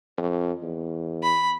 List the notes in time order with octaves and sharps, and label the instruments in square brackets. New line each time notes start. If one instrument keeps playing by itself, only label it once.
[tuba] F2
E2
[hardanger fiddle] B5